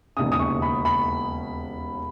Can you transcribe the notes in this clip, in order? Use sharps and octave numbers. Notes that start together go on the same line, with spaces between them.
E1 D#2 C#3 D#6
D#6
C#6
B5
B5